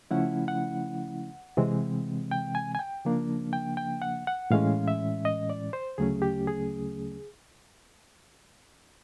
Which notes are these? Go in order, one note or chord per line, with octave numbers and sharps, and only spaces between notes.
C#3 F3 A3 C#4 E4 F#5
F#5
C3 E3 G#3 C4
G5
G#5
G#5
G5
C#3 F3 A#3 D4
G5
G5
F#5
F#5
A2 E3 G#3 C#4 F5
E5
D#5
D5
C5
D2 C#3 F#3 A3 C#4 G#4
G4
G#4